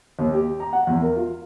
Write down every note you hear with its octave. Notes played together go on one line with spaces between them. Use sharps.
D#2
G4
A#5
F#5
E2
A#4
F4